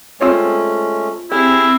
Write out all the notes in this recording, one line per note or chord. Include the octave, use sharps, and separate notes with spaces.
G#3 A3 C4 C#4 F4 C#5
C4 E4 G4 G#4 F6